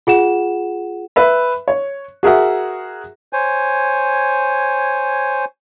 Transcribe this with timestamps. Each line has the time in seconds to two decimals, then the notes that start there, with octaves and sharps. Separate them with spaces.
0.07 F4 G#4 F#5 E7
1.16 B4 E5 B5
1.68 C#5
2.23 F#4 G#4 A#4 E5 F#5
3.33 C5 C#5 G#5